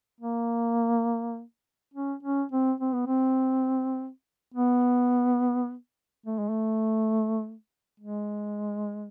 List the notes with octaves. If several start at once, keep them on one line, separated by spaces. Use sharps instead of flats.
A#3
C#4
C#4
C4
C4
B3
C4
B3
A3
G#3
A3
G#3